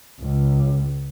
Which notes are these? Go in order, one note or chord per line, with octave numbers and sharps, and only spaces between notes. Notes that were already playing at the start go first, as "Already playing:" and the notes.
C#2